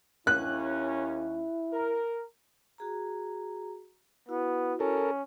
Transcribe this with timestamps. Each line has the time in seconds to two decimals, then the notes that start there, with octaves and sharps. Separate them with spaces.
0.27 D#2 C#4 E4 F#6
1.73 A#4
2.78 F#4 G#4 A#5
4.29 B3 E4 F#4
4.80 C#4 A4 A#4